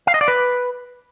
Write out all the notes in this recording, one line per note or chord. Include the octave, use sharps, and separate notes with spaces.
F5
D#5
D5
B4